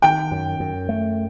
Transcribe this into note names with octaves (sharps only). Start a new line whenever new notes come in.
D#3 G5
F#2
F#2
A3